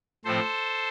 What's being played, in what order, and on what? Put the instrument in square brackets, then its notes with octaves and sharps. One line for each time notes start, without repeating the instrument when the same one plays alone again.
[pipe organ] A2 F3 C4 A4 C5